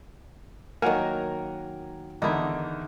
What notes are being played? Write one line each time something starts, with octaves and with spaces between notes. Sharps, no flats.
D#3 F#3 A#3 A#4 F#5 G#5
E2 D3 D#3 D#4 E4